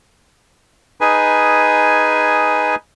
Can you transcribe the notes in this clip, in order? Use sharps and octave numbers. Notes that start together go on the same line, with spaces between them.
D#4 G#4 B4 G#5